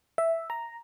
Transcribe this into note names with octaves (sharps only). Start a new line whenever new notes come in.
E5
A#5